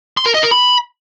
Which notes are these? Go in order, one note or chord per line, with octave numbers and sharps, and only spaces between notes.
C6
A#4
D#5
A#4
B5